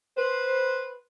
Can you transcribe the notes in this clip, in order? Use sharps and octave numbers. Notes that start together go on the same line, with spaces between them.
B4 C5